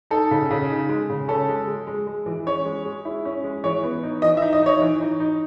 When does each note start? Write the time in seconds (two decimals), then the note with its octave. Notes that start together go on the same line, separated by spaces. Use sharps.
0.11 D#4 A4
0.31 C#3
0.51 C#3
0.70 D#4
0.89 G#3
1.10 C#3
1.28 C#4 A4
1.48 G#3
1.67 G#3
1.87 G#3
2.07 G#3
2.26 E3
2.46 C#4 C#5
2.65 G#3
2.85 G#3
3.05 E4
3.25 C#4
3.44 G#3
3.64 E3 C#5
3.83 B3
4.03 D#4
4.22 E3 D#5
4.37 E5
4.42 D#4
4.53 D#5
4.62 D#4 C#5
4.82 E3
5.01 D#4
5.20 D#4